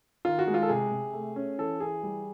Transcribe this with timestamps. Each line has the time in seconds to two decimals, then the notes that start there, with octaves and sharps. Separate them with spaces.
0.25 D#3 F4
0.39 F#4
0.47 G#3
0.54 F4
0.62 A4
0.69 C3 G#4
0.91 C3
1.13 A3
1.36 C#4
1.58 E3 A4
1.80 E3 G#4
2.03 G3